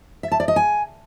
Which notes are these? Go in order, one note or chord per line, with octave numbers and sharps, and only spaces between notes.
E5
A5
D5
D#5
G#5